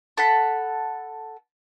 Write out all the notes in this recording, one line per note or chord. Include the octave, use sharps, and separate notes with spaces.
A4 F#5 B5